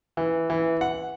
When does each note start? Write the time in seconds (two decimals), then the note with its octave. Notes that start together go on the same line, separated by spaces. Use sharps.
0.17 E3
0.50 E3
0.81 F#5